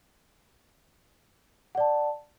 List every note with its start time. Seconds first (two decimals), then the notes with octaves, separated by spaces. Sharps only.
1.75 F#5
1.78 D5
1.80 A5